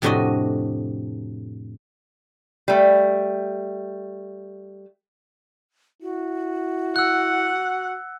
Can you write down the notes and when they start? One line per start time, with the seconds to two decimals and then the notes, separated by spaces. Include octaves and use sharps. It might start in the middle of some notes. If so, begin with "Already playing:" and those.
0.02 F2 A2 C3 D4 F#4 D#5
2.68 G3 A3
6.02 E4 F#4
6.96 F#5 E6 F#6